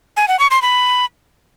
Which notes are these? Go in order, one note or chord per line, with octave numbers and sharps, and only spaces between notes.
G#5
F#5
C#6
C6
B5